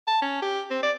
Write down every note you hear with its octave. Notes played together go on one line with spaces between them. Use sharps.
A5
C#4
G4
C4
D5